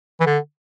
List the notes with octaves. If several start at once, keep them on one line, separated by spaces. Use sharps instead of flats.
E3
D3